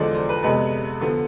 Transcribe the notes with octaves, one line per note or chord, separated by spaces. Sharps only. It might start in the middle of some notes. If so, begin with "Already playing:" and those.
Already playing: E2 D3 F3 G#3 D5
C5
B4
F2 C3 G#3 B3 B4
D3 F3 B3